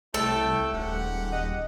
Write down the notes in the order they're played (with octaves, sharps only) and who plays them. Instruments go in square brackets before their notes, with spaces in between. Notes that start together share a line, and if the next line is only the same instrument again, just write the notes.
[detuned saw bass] C2 [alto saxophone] A3 [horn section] E4 C#5 G5 [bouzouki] A4
[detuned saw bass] D#1 [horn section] G#2 G4 F#5
[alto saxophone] D#5